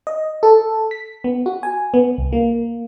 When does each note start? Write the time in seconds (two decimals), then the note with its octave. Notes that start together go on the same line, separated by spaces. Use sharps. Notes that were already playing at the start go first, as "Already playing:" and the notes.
0.07 D#5
0.43 A4
0.91 B6
1.24 B3
1.46 F#4
1.63 G#5
1.94 B3
2.18 C2
2.33 A#3